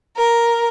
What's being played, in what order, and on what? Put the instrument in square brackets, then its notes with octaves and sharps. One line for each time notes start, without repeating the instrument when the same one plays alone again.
[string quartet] A#4